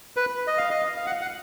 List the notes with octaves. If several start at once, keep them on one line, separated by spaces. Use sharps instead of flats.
B4
D#5
F5
D#5
F5
F#5
F#5